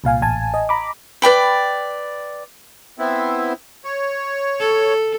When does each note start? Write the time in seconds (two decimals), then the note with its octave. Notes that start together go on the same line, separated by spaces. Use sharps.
0.04 C2 A#2 F5 G#5
0.22 A1 G#5 A5
0.54 D#5
0.69 A#5 B5 D6
1.22 B4 D5 G5 B5
2.99 B3 C4 E4
3.85 C#5
4.60 A4